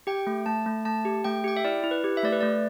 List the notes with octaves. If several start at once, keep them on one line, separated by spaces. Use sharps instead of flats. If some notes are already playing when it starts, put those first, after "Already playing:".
G4 G5
A3
A3 A5
A3
A3 A5
G4
A3 G5
G4 G5
E5
E4 D5
E4
B4
G4
E5
A3 D5
B4
A3 D5